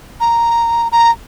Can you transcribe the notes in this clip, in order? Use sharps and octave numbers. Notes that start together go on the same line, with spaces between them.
A#5
A#5